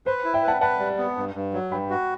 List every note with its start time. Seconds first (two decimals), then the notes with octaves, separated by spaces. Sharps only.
0.06 B4 C5
0.25 E4
0.34 E5 G5
0.43 B4 F#5 A5
0.61 B4 F#5 A5
0.79 G3
0.98 B3
1.17 G2
1.35 G2
1.53 F#3
1.71 G2 G5 B5
1.90 F#4